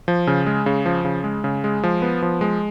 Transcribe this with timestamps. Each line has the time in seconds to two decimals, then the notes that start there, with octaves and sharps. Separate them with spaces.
0.08 F3
0.27 C#3
0.47 G#3
0.66 C#3
0.86 F3
1.05 C#3
1.24 G#3
1.44 C#3
1.64 G#3
1.83 F3
2.02 B3
2.22 F3
2.41 G#3